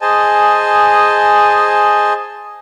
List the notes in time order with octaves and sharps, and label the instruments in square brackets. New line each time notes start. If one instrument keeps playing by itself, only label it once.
[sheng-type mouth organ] G#4 C5 D#5 G#5 A5